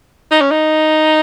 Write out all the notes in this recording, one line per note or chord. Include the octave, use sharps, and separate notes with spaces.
D#4
C#4
D#4